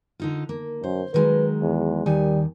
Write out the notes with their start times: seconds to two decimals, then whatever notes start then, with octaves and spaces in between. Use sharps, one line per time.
0.20 D3 D#4 F4
0.49 A#3
0.84 F#2 C5
1.14 D#3 F#3 G#3 B4
1.62 E2
2.06 D#2 D#3 G3 G#5